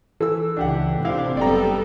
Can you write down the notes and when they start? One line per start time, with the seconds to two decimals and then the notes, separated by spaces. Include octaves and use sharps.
0.20 E3 A4 E6
0.57 C#2 E3 D4 G4 F#5
1.05 C3 C4 D4 E4 G4 F5
1.37 F#1 G3 B3 A4 D5 G5 A#5